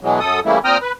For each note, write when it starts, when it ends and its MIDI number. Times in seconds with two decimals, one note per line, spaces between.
0.01 0.20 47
0.01 0.20 52
0.01 0.20 54
0.01 0.20 56
0.20 0.40 42
0.20 0.40 69
0.20 0.40 87
0.45 0.58 49
0.45 0.58 52
0.45 0.58 55
0.45 0.58 57
0.45 0.58 58
0.45 0.58 64
0.64 0.78 46
0.64 0.78 60
0.64 0.78 79
0.64 0.78 82
0.64 0.78 87
0.64 0.78 89
0.82 0.92 71